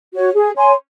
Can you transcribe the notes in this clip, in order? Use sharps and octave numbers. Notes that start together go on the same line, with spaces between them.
F#4 C#5
G#4
C#5 G#5 C6